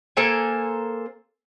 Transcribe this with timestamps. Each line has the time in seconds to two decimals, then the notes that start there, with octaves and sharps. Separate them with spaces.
0.17 A#3 A4 C5 G#5